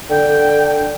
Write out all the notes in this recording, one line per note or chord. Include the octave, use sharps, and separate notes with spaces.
D3 G5